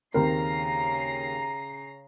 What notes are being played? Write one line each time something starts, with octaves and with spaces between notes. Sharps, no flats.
D#2 C#3 C4 A#4 A#5 C7